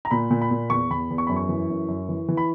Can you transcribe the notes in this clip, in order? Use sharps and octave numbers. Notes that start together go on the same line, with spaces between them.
A#5
A#2 B5
A#2
B5
A#2
E2 C#6
E2 B5
E2
C#6
F#2 B5
C#6
E3
F#2
F#2
E3
E3
B5